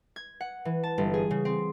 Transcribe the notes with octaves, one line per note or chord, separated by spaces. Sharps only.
G#6
F#5
E3
A5
G1
G#4
C#3
C4